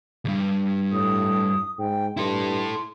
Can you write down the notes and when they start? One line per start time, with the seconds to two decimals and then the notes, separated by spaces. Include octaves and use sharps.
0.25 C#2 G2
0.92 A2 D#6
1.78 G#2 G5
2.17 G2 E4 A4 C6